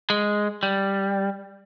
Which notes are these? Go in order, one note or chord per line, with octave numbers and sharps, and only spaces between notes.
G#3
G3